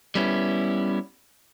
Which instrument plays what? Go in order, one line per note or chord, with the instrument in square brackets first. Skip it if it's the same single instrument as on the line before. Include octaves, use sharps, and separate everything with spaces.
[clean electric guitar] G3 B3 C#4 E4